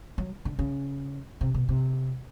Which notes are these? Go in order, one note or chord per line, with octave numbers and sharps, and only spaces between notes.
F#3
D3
C#3
C3
B2
C3